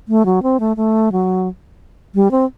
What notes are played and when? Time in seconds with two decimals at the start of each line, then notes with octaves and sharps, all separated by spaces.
0.08 A3
0.26 F#3
0.43 C4
0.60 A3
0.77 A3
1.12 F#3
2.15 G3
2.31 C4